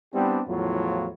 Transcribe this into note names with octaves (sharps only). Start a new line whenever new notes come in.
G3 B3 C4 D4 E4 G4
E2 A2 F3 F#3 F4